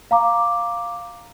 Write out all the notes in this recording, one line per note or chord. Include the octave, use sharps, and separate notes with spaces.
F5 A#5 D6